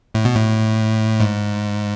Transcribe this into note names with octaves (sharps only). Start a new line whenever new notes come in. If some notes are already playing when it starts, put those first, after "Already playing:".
A2
B2
A2
G#2